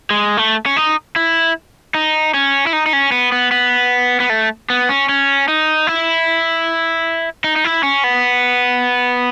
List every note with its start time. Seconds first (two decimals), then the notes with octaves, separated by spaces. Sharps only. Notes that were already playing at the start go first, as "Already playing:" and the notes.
0.11 G#3
0.37 A3
0.66 C#4
0.76 D#4
1.16 E4
1.95 D#4
2.34 C#4
2.67 E4
2.73 D#4
2.86 D#4
2.93 C#4
3.12 B3
3.32 B3
3.51 B3
4.20 B3
4.30 A3
4.70 B3
4.89 C#4
5.09 C#4
5.48 D#4
5.87 E4
7.44 D#4
7.56 D#4
7.64 E4
7.83 C#4
8.04 B3